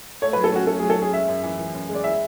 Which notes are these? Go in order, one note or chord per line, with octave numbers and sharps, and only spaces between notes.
A3 C#5
B4
F#3
A4
C#4 F#4
A3 A4
F#3 G#4
A4
C#4 G#4
G#3 E5
F#2
E3
E3
F#2
G#3
D5
E4 E5